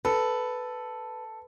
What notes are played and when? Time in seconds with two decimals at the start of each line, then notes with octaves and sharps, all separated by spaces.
0.05 A4 B4